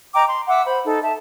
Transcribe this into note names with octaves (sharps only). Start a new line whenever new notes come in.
D#5 G5 A#5 D6
C6
E5 F#5 D6 E6
C5 B5
D#4 A4
E5 A5